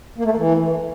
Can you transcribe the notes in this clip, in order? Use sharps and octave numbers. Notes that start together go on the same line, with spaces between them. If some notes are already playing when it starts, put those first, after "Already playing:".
A#3
A3
A#3
E3